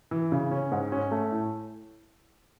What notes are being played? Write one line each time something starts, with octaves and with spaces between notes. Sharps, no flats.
E3
C#3
C#4
G#2
C#4
A3
A2